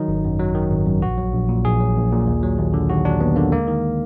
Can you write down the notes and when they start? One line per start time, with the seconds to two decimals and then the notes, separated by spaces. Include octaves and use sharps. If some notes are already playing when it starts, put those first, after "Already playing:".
Already playing: D#3 F#3 D#4
0.08 G#1
0.24 F#2
0.39 F#3
0.55 D#3
0.71 G#1
0.86 F#2
1.02 A#1 F#4
1.18 F#3
1.33 A#1
1.49 A#2
1.65 A#1 G#4
1.80 F#3
1.96 A#1
2.12 A#2
2.27 D#2
2.43 F#3
2.58 D#2
2.74 D3
2.89 D#2 F#4
3.05 F#3 D4
3.21 D#2 B3
3.36 D3 A#3
3.52 G#3 A#3
3.67 D#3